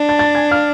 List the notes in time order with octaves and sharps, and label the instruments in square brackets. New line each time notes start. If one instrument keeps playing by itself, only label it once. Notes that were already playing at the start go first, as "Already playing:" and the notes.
Already playing: [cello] D4
[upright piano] A5 A6
A5 A6
G#5 G#6
F5 F6